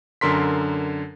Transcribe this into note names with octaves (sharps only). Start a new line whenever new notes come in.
F#2 D3 A#4 C6 B6